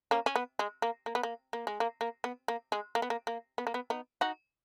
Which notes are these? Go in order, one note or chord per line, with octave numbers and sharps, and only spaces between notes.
A#3 C#4
C#4
B3
G#3
A#3
A#3
B3
A#3
A#3
G#3
A#3
A#3
B3
A#3
G#3
A#3
B3
A#3
A#3
B3
A#3
B3
B3 D#4
D#4 F#4